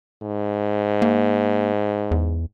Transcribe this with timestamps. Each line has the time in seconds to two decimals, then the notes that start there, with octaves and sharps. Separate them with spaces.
0.23 G#2
1.02 A#3
2.11 E2